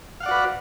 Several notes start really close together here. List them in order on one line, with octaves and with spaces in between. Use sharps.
F5 F#5 D5 F#4 B4